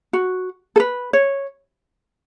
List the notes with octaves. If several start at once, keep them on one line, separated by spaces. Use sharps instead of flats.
F#4
A4
B4
C#5